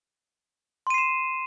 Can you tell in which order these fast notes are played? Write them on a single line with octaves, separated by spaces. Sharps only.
C6 D#7 C7 E7